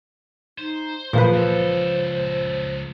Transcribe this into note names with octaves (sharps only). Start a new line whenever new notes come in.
D#4 C5
A#2 E3 F3 A#3 G#4 B4
C#2 A4 C5